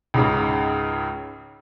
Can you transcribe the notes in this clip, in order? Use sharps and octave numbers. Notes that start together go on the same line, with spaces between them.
C#2 G#2 C#3